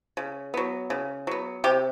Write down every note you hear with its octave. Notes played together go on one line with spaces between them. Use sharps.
C#3
F#3 B3
C#3
F#3 B3
C3 G4